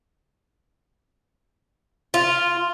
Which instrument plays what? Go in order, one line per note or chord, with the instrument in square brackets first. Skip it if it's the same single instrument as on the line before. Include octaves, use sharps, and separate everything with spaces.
[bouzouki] F4